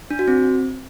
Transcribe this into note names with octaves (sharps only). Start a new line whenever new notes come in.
D4
F#4
C4